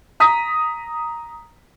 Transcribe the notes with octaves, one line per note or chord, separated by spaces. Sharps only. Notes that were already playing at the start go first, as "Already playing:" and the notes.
A#5 D#6 B6